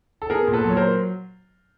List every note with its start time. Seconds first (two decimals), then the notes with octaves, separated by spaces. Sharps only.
0.22 A4
0.30 B3 G#4 A#4
0.47 A#2
0.53 A4 B4
0.64 F#3 C#5
0.77 A#4 C5